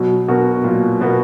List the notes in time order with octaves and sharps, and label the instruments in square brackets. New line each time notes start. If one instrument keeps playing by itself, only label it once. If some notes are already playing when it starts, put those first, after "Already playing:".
Already playing: [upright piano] B2 [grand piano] F#3
[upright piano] B2 [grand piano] B3 F#4 A#4
[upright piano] A#2 [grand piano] F#3
[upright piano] B2 [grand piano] B3 F#4 A#4